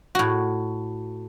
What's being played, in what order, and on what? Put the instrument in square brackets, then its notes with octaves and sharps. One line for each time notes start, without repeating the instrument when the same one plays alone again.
[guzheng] A2 F#4